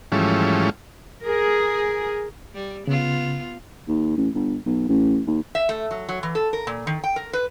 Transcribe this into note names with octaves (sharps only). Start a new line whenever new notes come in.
G#2 E3 F3 G3 A3 C#4
G#4 A#4
G3
C#3 B3 F4
D#2
A1
G1
B1
A1
D#2
E5
A3
F#3
F#3
E3
A4
A#4
A#2
D#3
G5
A#4
B4